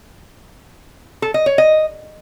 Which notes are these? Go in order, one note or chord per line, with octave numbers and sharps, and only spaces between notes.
A4
D#5
C#5
D#5